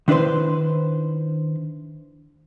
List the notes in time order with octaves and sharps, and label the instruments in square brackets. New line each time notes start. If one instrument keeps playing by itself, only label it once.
[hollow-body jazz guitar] D#3 D4 E4 B4 C5